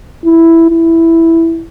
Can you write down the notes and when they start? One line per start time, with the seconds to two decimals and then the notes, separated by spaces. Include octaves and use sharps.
0.25 E4
0.70 E4